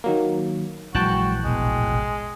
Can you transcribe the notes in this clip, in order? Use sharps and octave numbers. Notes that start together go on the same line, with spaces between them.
D#3 F#3 A#3
A#1 E3 F#3 G#3 F#4 G5 A5 F#6
E1 A1 B2 G#3